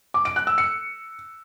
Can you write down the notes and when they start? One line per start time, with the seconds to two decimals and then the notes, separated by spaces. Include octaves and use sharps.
0.14 D6
0.25 D7
0.36 F#6
0.47 E6
0.58 C#7